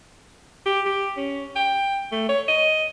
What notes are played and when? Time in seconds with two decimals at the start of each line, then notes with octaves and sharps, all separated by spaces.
0.66 G4
0.86 G4
1.17 C#4
1.56 G5
2.12 A3
2.29 C#5
2.48 D#5